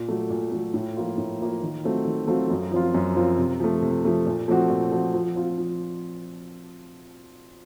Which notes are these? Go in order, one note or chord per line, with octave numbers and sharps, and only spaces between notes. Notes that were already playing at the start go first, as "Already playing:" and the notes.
Already playing: A#2
F#3 A3
A#2
F#3 A3
A2
F3 A#3 F4
A2
F3 A#3 F4
D#3
F#3 A3 C4 F4
D#3
F#3 A3 C4 F4
F#2
F3 C4 F4
F#2
F3 C4 F4
C3
F3 A3
C3
F3 A3
A#2
F3 A3 C4 F#4
A#2
F3 A3 C4 F#4
F3
C4 F4
F3